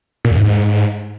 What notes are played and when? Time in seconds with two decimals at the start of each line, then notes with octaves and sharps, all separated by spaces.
0.25 A#2
0.31 E2
0.37 G#2